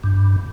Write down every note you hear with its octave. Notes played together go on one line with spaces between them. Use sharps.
G2